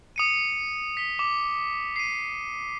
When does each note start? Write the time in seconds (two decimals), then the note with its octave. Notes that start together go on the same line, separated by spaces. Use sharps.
0.16 D#6 C#7 D#7
0.97 B6 G7
1.19 D6
1.96 C7 D#7